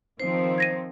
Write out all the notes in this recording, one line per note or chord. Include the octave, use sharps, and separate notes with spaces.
D#3 F3 C4 C5
G#6 A#6 D#7